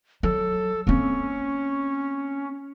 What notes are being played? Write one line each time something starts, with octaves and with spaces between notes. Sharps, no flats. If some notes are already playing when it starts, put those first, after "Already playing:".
F#3 A4
A#3 C4 C#4